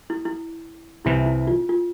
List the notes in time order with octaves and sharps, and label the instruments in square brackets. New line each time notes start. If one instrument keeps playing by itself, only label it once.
[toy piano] E4
E4
[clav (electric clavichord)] C2 C3 E3 [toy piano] E4
[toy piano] E4
F4
F4